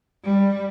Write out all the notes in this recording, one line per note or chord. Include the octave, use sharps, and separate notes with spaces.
G3